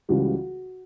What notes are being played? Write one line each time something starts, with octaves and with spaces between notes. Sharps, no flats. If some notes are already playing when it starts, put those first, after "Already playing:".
C#2 C#3 E3 G3 F#4